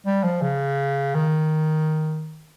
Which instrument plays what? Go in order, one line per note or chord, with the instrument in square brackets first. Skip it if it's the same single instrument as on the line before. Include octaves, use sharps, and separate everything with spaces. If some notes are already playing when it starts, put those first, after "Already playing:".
[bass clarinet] G3
F3
C#3
D#3